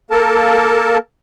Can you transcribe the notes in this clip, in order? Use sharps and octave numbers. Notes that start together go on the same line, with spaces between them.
A#3 A4 A#4 A5